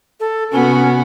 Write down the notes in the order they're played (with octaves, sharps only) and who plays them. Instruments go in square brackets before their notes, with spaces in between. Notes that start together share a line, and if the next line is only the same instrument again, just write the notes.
[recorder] A4
[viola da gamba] C3 B3 F#4 [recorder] C#4